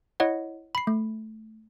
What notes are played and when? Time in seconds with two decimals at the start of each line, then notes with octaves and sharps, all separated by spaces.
0.20 E4 C#5 D#5 F#5
0.75 B5 C7
0.87 A3